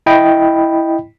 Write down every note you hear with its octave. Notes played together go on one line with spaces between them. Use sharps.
E4 D#5 G5 B5